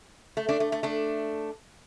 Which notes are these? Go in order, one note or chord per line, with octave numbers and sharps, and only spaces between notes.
A3
A3 D4
A3
A3
A3 D4